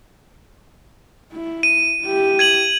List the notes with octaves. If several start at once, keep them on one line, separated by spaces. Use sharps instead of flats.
E4
D#7
E4 G4
G#6 D#7 F#7